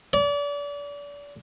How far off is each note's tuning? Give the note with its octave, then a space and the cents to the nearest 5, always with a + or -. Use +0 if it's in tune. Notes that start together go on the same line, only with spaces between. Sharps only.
D5 -35